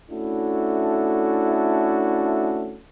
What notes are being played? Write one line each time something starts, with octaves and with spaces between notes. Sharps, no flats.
A3 C#4 D4 E4 F#4 A4